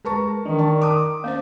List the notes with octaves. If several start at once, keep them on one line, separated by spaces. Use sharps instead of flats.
G#3 A#4 B4 A5 A#5 C#6
D#3 E3 D4 D#4
D5 A5 C#6
D6 D#6
A#3 C#4 C5